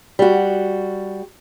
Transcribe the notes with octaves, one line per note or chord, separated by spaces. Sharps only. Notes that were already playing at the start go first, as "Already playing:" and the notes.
G3 F#4